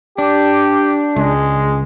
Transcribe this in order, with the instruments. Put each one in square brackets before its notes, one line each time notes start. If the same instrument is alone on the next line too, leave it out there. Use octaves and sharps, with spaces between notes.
[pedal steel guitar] D4 [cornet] G4
[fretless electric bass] C#2 [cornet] G#3